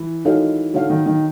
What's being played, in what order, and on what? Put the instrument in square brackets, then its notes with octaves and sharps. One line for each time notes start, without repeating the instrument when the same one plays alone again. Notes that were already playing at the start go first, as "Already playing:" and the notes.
Already playing: [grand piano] E3
[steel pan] D#4 F#4 A4 C#5 F5
[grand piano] D3 [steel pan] D#4 F#4 A4 C#5 F5
[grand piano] D#3
D#3